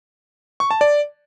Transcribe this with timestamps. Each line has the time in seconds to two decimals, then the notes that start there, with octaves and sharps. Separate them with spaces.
0.60 C#6
0.71 A5
0.81 D5